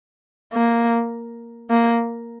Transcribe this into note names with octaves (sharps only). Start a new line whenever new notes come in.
A#3
A#3